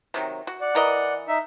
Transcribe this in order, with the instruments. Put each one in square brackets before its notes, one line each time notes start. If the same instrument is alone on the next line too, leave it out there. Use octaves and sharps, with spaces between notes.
[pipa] C3 D#3 F#3
F#4
[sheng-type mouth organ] D5 F#5
[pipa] E3 A#4 D#5
[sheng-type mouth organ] D#4 E5